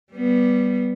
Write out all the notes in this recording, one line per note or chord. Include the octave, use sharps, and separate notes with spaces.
G3 B3